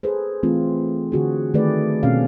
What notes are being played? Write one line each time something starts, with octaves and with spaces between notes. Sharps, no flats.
G#4 A4 B4 C5
E3 F#3 A3 C4 F4
D3 F#4 G#4
D#3 A3 G4 G#4 B4 D5
B2 C4 C#4 C#5 F5